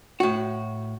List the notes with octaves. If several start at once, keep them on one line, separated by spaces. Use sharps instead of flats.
A2 F#4